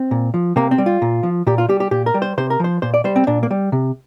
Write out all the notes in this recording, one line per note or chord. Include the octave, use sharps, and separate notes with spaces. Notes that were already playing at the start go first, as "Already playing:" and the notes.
Already playing: C4
A#2
F3
C3 A#3
C4
G3
F4
A#2
F3
A#2 G4
F4
G3 G4
G4
A#2 G4
A#4
G3
C5
C3 C5
A#4
F3 C5
A#2 C5
D5
G3 C5
C4
A#2 D4
A#3
G3
C3